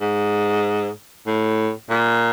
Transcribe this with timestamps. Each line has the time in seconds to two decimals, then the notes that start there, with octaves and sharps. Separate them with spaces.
0.01 G#2
1.26 A2
1.90 A#2